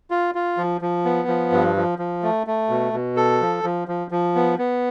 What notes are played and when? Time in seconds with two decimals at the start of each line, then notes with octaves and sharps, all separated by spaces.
0.10 F4
0.35 F4
0.57 F3
0.81 F3
1.05 B3
1.28 F3
1.52 G2
1.76 F3
1.99 F3
2.23 A3
2.47 A3
2.69 B2
2.93 B2
3.17 A4
3.41 F3
3.63 F3
3.88 F3
4.11 F3
4.35 B3
4.58 B3